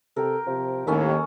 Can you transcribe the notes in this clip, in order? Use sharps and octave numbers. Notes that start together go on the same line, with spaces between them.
C3 A4 A#4 G5
C3 F3
D#2 A2 D#3 C#4 A4 B5